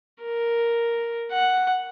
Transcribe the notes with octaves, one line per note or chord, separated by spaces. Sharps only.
A#4
F#5